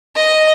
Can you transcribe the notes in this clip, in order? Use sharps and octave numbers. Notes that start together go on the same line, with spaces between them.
D#5